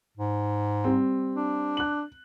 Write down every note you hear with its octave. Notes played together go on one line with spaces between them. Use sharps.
G#2
G3 C4
D4
F#6 F#7